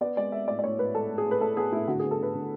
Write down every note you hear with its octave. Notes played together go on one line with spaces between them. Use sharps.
B3 D5
G#3 D5
G#3 E5
A2 D5
D5
A2 C#5
A2 B4
G#3 A4
A2
G#4
A2
B4
A2 A4
B3 G#4
A2 E4
D3 F#4
B3 G#4
A4
D3 B4
D3